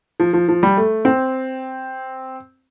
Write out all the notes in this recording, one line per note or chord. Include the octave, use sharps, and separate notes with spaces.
F3
F3
F3
G3
A3
C4